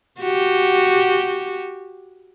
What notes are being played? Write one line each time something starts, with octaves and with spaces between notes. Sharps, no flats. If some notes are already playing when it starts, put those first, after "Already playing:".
F#4 G4